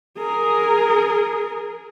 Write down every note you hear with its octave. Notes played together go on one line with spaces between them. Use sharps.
G#4 A#4